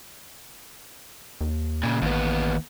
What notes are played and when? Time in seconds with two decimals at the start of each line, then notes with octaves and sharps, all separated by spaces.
1.41 D#2
1.83 A#2 C#3
2.02 A1 D#2 B3